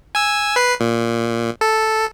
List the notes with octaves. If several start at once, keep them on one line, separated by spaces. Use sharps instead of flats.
G#5 E6
B4 C7
A#2
A4